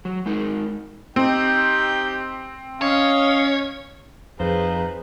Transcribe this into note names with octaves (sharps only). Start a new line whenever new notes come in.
F#3
G#3 D#4 A#4
C4 D#4 G4 G5
C#4 C#5 D#5 F5
F2 D#4 F4 G#4 B4 C5